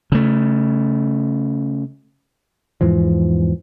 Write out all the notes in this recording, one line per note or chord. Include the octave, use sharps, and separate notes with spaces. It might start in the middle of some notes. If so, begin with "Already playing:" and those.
C#3 A3
E2 G#2 E3 F3